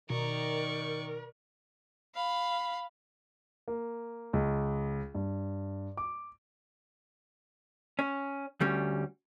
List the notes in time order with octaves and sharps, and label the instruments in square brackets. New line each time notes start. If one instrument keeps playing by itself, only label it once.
[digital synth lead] B2 [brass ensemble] D#3 [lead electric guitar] A#4 [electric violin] D5 C#6
[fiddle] F5 B5
[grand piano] A#3
C#2
G2
D6
[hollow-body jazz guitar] C#4
D2 G3 C#4